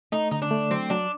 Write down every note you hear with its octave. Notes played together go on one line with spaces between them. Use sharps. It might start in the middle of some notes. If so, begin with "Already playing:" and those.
A3 D#4
D3 D#4
D4
A3
F#3 C4
F#3 D4